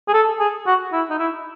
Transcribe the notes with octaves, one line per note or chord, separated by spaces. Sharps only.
G#4
A4
G#4
F#4
E4
D#4
E4